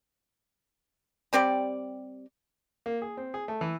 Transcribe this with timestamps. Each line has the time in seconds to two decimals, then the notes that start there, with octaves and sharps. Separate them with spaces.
1.33 G3 C4 G4 D5
2.86 A#3
3.02 G#4
3.17 C4
3.34 G#4
3.48 A3
3.61 E3